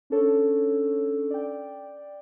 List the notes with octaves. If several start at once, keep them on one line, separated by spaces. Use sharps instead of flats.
C#4 D4 A4 C#5
D5 G5